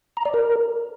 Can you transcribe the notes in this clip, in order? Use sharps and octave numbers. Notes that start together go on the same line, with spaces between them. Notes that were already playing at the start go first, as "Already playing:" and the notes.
A#5
D5
A#4